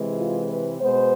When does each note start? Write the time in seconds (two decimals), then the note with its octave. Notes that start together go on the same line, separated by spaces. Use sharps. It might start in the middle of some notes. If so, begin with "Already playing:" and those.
Already playing: C3 E3 G#3
0.17 F4
0.48 B4
0.79 B2 G#3 B3 C5